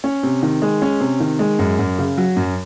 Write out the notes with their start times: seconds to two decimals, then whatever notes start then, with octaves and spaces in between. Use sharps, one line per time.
0.04 C#4
0.23 C3
0.43 D#3
0.62 G#3
0.82 C#4
1.01 C3
1.20 D#3
1.39 G#3
1.59 F#2
1.79 F#2
1.99 C#3
2.18 F#3
2.36 F#2